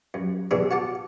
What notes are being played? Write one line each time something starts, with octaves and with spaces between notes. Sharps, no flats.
F#2
B2 D#3 E3 D4 G#4
F#4 F#5 A5 D6